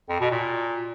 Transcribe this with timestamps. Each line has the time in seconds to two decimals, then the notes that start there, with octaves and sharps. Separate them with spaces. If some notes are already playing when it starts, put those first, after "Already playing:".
0.09 F2
0.20 B2
0.31 A#2